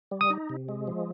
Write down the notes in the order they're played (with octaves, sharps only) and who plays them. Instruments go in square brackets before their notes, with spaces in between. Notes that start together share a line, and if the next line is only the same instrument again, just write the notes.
[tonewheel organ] G3
[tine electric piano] D#6
[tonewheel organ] D#4
C3
G#3
F3